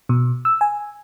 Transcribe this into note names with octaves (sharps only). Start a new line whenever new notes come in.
B2
E6
G#5